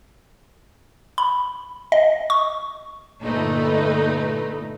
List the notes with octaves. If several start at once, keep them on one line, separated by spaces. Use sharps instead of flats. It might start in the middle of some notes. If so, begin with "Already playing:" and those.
B5
D#5
C#6
G1 A#2 A3 D#4 B4